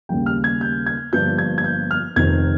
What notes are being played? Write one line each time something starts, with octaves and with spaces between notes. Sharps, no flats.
D#2 C#3 G3 A#3 G5
F6
G#6
G6
G#6
G1 G2 F3 A#3 G6
G#6
G#6
G6
F6
F1 F2 D#3 G#6